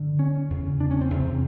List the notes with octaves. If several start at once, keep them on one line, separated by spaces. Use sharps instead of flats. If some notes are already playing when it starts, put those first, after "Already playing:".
Already playing: G2 D3
C#4
E2 C#3
D4
C#4
C4
E2 C3